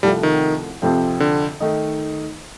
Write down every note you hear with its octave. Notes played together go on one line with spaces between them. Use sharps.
C2 C3 F3 G3 A3
D#3
F2 C3 F3 C4
D3
D#3 A3 D#4